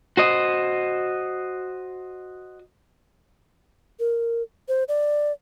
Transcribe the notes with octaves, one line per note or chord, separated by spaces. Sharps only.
F#4 C5 D#5
A#4
C5
D5